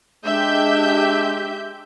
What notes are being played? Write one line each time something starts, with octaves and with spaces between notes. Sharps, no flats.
G#3 D4 G4 E5 G6